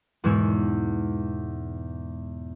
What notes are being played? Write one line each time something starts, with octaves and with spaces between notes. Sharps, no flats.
E2 G#2 B2 G#3 C#5 E6